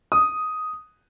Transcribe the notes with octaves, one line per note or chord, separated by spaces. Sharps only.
D#6